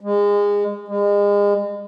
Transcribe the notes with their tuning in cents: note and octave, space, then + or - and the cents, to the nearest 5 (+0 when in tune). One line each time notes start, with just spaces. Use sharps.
G#3 -25
G#3 -35